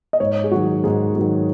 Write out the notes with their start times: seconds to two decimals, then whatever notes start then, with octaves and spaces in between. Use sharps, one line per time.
0.13 D#5
0.20 G#2 C#5
0.44 G#4
0.52 D#3 F#3 F#4
0.84 G#2 G#4
1.15 D#3 F#3 G#4